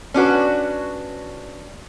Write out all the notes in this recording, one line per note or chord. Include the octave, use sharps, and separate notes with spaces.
C#4 D4 F#4 B4